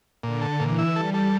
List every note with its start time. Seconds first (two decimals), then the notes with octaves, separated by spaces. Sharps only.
0.23 A#2 D3
0.41 A4
0.59 A#2 E3
0.78 E4
0.96 G3 A4
1.14 A4